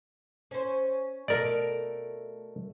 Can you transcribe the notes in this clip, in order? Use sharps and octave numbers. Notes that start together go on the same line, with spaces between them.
C#4 C5
B2 A3 A#4 D5